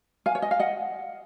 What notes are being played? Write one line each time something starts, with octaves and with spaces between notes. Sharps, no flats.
F5 G#5
C#5
D#5
F5
D#5 F#5